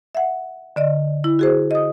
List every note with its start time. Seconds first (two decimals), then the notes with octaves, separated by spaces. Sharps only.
0.15 E5 F#5
0.76 D3 D5 D#5
1.24 E4
1.39 F#4 G#4 C5
1.71 D#5 D#6